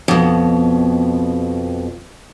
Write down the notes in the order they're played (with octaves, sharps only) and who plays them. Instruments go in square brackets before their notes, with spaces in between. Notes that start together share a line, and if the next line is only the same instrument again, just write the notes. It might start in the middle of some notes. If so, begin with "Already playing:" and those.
[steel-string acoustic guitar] F2 B2